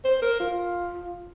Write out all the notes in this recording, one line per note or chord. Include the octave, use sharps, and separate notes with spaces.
C5
A#4
F4